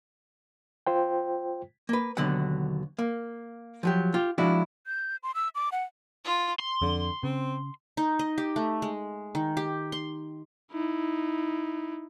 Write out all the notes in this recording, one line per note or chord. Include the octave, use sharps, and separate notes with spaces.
F4 C5 G5
A#3 B4
D#2 B2 D3 F#3 B3 F#5
A#3
F3 F#3 G4
F4 G4
F3 G#3 D4 E4 F#4
G6
C6
E6
D6
F#5
F4
C6
F2 D3
C#3 C4
D#4
D#5
G4
A3
G#3
D#3
G4
C6
D#4 E4